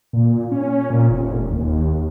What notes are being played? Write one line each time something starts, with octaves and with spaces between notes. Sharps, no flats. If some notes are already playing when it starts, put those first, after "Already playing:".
A#2
C#4
A#2
F1
D#2